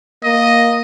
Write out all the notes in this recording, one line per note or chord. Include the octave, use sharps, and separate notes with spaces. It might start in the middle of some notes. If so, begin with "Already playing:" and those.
A#3 D#5